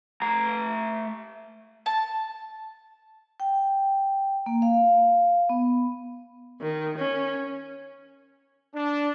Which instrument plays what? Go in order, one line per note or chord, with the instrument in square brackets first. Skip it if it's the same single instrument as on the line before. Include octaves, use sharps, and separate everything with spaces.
[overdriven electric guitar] A3 A#5
[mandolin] A5
[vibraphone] G5
A#3
F5
B3
[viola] D#3
C#4
[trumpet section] D4